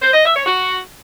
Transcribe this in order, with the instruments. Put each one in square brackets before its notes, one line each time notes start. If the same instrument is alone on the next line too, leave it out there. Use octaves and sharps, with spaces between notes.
[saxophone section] C5
D#5
E5
C#5
F#4